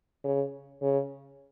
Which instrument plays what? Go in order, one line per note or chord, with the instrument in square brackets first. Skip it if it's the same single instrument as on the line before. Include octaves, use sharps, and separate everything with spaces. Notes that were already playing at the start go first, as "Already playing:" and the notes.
[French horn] C#3
C#3